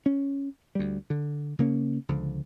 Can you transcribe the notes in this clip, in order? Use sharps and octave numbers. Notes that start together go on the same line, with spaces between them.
C#4
D2 G3
D3
C#3 A#3 C#4
C#2 D3 F3